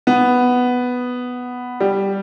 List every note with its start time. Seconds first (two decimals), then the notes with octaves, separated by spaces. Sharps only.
0.07 B3
1.80 G3